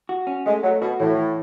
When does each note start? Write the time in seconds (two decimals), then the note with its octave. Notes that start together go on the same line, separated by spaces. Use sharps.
0.09 F#4
0.27 C#4
0.46 G#3 A3
0.63 F#3 A3
0.81 B2 F#4
0.99 A2 E3
1.16 E3